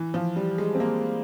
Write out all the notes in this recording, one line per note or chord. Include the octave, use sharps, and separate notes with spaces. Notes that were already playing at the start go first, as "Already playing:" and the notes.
Already playing: E3
F3
G3
G#3
C4
A#3